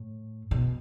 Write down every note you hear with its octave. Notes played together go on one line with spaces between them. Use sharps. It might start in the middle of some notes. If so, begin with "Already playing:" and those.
Already playing: A2
B2